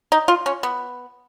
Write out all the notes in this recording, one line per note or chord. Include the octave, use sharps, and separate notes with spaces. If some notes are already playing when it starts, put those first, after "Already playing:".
D#4
F4
C#4
B3